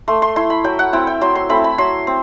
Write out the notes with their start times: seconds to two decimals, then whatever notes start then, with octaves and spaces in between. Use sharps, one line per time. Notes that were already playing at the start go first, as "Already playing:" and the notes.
0.08 A3 C6
0.22 C6
0.36 E4 C6
0.50 B5
0.64 F#3 G5
0.79 F#5
0.93 C4 E4 G5
1.07 G5
1.21 F#3 C6
1.35 C6
1.49 A3 C4 E4 B5
1.64 B5
1.78 F#3 C6
2.07 C4